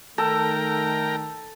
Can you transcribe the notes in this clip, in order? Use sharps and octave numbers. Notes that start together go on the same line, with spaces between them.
D#3 A3 A4 A#4 G5 A#5